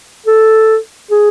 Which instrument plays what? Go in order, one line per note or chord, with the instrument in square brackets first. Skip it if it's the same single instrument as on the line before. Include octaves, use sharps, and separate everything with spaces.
[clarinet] A4
G#4